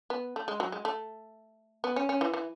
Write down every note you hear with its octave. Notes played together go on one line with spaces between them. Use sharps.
B3
A3
G#3
F#3
G#3
A3
B3
C#4
C#4
E3
E3